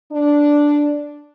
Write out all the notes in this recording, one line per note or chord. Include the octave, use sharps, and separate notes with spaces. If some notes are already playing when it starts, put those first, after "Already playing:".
D4